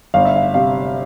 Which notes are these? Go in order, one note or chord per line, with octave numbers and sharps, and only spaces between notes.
G1 F5
E5
F5
C3 F5